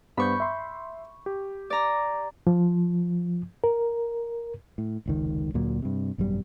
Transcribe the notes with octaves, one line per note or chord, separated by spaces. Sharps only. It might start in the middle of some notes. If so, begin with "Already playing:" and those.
G2 B3 C5 B5 C#6 G6
E5 C6
G4
D5 A#5
F3
A#4
A2
F1 C#2 D#3
D2 A#2 F#3
G2 C3
G#1 F#2 B2 G3